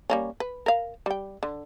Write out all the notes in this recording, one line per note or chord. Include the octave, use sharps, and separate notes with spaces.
G3 A#3 C#4
B4
A#4 F5
G3 G5
D3